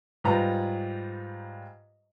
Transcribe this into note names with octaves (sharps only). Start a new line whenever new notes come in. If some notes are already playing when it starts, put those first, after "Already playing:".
G#2 G3 F4 B4 A#5